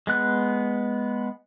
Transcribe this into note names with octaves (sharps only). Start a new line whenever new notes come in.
G#3 B3 F#6